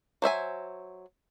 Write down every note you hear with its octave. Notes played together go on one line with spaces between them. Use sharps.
F#3 C5 E5 G#5